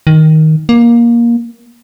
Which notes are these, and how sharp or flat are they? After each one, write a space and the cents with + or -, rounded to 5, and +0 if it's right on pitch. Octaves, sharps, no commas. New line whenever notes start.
D#3 +10
A#3 +15